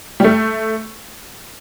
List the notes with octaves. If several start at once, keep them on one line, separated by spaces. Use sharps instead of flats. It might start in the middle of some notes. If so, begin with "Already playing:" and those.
G3
A3